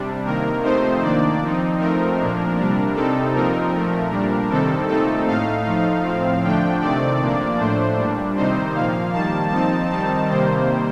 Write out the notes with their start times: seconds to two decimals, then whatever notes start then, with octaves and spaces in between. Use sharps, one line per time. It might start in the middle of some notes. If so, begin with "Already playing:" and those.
Already playing: C3 G3 D4
0.25 C3 D#3 A#3 A#4
0.63 C3 F3 A3 C4 D#4 C5
1.02 D#3 A#3 D4 D5
1.41 F3 C4 D#4
1.80 F3 A3 C4 D#4 A#4
2.19 A#2 F3 A#3 D4
2.57 C3 G3 D4
2.95 C3 G3 C4 D#4 A4
3.34 A#2 F3 C4 D#4 A#4
3.72 A#2 F3 A3
4.11 A#2 G3 D4
4.50 C3 D#3 G3 C4 A4
4.88 A#2 A3 C4 D#4 A4
5.27 A2 A3 D#4 F5
5.65 F3 A3 D#4
6.04 A2 F3 C4
6.43 D3 F3 A3 D4 G5
6.81 C3 D#3 A3 C4 D5
7.20 A#2 F3 A#3 D4
7.59 A2 A3 D4 C5
7.97 A#2 G3 D4
8.36 C3 D#3 G3 C4 D#4 C5
8.75 A#2 F3 A#3 F5
9.13 D#3 G3 A#3 A5
9.52 F3 C4 D#4 A5
9.91 D#3 G3 C4 D#4 A5
10.29 C3 D#3 G3 A#3 C5